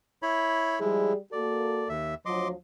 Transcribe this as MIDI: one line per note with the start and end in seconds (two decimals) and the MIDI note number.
0.22 0.79 64
0.22 0.79 73
0.22 0.79 83
0.80 1.13 53
0.80 1.15 55
0.80 1.13 56
0.80 1.13 64
0.80 1.15 68
1.32 1.90 58
1.32 1.90 66
1.32 1.90 69
1.32 1.89 74
1.89 2.14 39
1.89 2.14 76
2.26 2.52 38
2.26 2.52 53
2.26 2.52 54
2.26 2.48 75
2.26 2.48 84
2.26 2.48 86